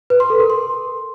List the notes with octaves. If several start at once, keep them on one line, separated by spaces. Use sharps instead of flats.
B4
C6
A4
A#4
C6